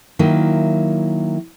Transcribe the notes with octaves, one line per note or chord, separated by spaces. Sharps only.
D#3 F#3 A#3 E4